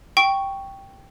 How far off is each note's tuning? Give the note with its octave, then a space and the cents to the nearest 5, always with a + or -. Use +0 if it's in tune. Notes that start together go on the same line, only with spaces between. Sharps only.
G5 +0 C#6 +0